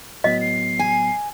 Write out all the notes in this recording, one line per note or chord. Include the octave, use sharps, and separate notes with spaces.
A2 F#3 B3 D#5 B6
C7
G#5